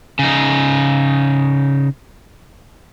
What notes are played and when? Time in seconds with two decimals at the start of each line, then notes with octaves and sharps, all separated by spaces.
0.19 C#3 D#4